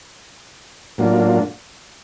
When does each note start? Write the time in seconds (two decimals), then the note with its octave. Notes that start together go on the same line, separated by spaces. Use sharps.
0.98 A2 F#3 A#3 D4 F4